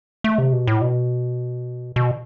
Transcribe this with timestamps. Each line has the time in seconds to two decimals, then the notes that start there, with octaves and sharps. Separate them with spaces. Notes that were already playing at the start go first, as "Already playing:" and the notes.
0.24 A3
0.38 C3
0.53 B2
0.67 A2
0.81 B2
1.96 B2